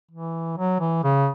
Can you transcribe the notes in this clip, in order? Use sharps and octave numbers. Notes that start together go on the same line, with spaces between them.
E3
F#3
E3
C#3